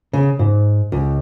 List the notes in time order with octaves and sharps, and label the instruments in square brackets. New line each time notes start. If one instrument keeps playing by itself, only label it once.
[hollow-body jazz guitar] C#3
G#2
C#2